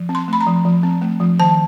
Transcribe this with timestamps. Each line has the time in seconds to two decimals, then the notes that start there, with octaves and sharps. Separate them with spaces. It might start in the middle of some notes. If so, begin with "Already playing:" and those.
Already playing: F3
0.09 C4
0.15 C6
0.28 A3 B5
0.41 A#5
0.47 F3
0.65 F3
0.83 C4
1.02 A3
1.20 F3
1.39 D#3 A5